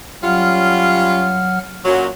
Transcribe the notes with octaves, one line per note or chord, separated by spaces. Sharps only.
F#3 G3 C#4 F4 F#5 F6
F#2 A#2 F#3